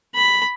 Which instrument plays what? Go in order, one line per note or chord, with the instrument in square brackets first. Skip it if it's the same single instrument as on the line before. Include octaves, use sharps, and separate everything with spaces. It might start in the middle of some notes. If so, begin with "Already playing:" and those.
[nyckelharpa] B5